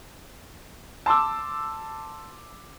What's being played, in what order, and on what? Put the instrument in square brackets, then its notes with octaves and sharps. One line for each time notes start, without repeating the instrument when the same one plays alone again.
[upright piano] A5 C6 D6 E6